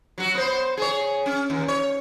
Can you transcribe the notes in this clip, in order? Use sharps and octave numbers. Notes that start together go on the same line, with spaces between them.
F#3 F#4
B3 C5
G#4 C#5
C#4
D#2
C#5